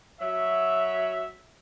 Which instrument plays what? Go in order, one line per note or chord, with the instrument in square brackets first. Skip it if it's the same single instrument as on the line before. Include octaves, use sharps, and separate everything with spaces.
[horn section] F#3 E5